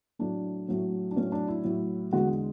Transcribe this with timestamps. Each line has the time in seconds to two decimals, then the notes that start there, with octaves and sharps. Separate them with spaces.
0.19 A2 F#3 A3 D4
0.68 A2 F#3 A3
1.11 D4
1.16 A2 F#3 A3 C#4
1.32 D4
1.48 E4
1.64 A2 F#3 A3
2.13 E2 D3 G#3 F#4